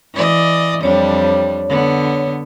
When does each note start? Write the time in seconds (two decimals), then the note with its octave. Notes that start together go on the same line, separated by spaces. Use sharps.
0.14 E3 D5 D#5
0.83 F2 G3 D4 C#5
1.69 D3 B3